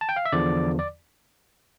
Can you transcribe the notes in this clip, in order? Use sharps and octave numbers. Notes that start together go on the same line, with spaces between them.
A5
G5
F5
E5
E2 D3 F3 D5
D5